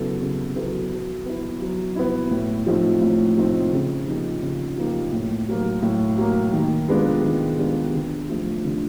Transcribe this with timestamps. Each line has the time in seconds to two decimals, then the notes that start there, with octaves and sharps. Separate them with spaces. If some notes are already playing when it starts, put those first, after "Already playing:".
Already playing: C#3 F#3 B3 E4 A4
0.21 C#3
0.56 F#3 B3 E4 A4
0.92 F#3
1.26 B3 E4
1.61 F#3
1.96 B3 E4
2.31 A2
2.66 F3 A3 C4 D#4
3.01 A2
3.37 F3 A3 C4 D#4
3.73 C#3
4.07 F3 A#3 D#4 G4
4.43 C#3
4.78 F3 A#3 D#4 G4
5.13 A2
5.48 F#3 A#3
5.82 A2
6.18 F#3 A#3
6.53 D#3
6.88 G#3 B3 D4 F4
7.24 D#3
7.58 G#3 B3 D4 F4
7.94 D3
8.29 F3 A3
8.65 D3